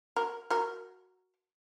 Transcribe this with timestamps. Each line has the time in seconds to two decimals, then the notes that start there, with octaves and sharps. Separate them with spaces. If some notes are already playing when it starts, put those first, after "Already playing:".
0.16 F#4 A#4
0.50 F#4 A#4